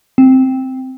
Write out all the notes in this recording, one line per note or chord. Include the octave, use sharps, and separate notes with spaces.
C4